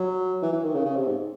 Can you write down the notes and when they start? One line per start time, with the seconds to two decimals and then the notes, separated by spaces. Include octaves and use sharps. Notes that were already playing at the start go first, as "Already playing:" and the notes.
Already playing: F#3
0.42 E3
0.52 E3
0.64 D#3
0.75 C#3
0.85 C#3
0.96 C3
1.07 G#2